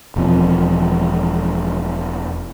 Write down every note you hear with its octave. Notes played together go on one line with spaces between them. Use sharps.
E1 E2 F3 C4